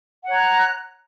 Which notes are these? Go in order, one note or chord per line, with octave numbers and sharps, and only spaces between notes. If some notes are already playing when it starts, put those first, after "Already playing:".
C#5 F#5 A#5 F#6